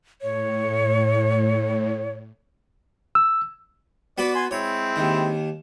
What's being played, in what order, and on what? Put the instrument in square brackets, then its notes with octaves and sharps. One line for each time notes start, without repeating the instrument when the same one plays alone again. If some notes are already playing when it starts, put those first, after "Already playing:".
[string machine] A2 [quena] C#5
[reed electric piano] E6
[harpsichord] B3 F#4 B4 [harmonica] D5
[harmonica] G#5 C6
[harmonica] G#3 C4 E4 [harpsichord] C#5
[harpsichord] D#2 D#3